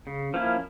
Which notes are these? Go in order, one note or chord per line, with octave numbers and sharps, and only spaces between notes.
C#3
F3 A#3 C#4 E4